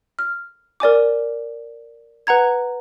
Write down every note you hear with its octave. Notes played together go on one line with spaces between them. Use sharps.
F6
A#4 D5 G#5 D6
B4 F#5 A#5 G#6